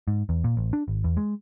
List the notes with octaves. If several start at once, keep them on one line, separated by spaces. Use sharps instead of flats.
G#2
E2
A#2
A1
D4
G#1
E2
G#3